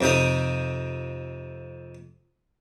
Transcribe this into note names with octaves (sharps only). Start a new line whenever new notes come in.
F2 C3 D#4 D#6